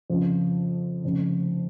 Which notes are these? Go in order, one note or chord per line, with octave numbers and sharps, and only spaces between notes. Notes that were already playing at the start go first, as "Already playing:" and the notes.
F2 C#3 F3
F1 F2 C#3